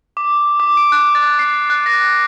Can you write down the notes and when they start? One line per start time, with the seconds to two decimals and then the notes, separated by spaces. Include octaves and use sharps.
0.17 D6
0.60 D6
0.77 D7
0.92 F#6
1.15 A6
1.39 C7
1.70 F#6
1.86 A#6